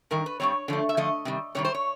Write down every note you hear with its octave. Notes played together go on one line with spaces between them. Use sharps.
G2 D#3 A#4
B4
G2 D#3 G3 C4 C#5
D3 F3 A3
E5
D3 F3 A3 D#5
C3 D#3 G3
C3 D#3 G3 C#5
C5
C#5